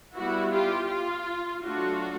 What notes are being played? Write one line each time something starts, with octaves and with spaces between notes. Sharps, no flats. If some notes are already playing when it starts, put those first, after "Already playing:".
G3 B3 E4 F#4
F4 G4
F4
F#3 A3 D4 F4 F#4